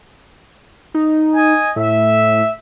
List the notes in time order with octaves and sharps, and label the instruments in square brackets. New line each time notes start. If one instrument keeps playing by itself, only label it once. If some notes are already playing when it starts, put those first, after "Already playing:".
[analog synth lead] D#4
[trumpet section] D#5 G#5
[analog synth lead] A2 [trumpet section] E5